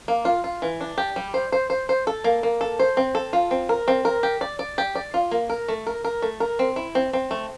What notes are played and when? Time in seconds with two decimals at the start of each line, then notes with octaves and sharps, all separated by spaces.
0.08 A#3
0.25 F4
0.44 F4
0.62 E3
0.81 D4
0.98 G4
1.16 G3
1.34 C5
1.52 C5
1.70 C5
1.89 C5
2.07 A4
2.24 A#3
2.43 A#3
2.61 A4
2.79 C5
2.97 C4
3.15 A4
3.33 F4
3.51 C4
3.69 A#4
3.88 C4
4.05 A#4
4.23 G4
4.41 D5
4.59 D5
4.78 G4
4.95 D5
5.14 F4
5.31 A#3
5.50 A#4
5.68 A3
5.87 A#4
6.04 A#4
6.22 A3
6.40 A#4
6.59 C4
6.76 E4
6.95 C4
7.13 C4
7.31 A3